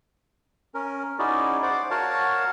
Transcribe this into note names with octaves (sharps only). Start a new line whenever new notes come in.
C#4 A#4
C#4 D#4 E4 F#4 G#4 D5
C5 D5 F#5 D6
F#4 A#4 C#5 F5 F#5 A5